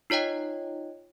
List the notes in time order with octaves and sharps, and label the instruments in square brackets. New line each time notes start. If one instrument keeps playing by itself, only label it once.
[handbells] D#4 F4 C#5 D#5 G5